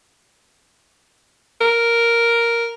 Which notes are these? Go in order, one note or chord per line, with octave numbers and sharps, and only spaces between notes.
A#4